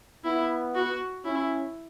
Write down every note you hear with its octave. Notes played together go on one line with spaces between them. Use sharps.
B3 E4
F#4
C#4 E4